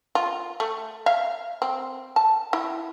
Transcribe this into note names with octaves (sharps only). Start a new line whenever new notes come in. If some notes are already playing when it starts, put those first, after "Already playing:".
F4
A3
E5 F5
C4
A5
E4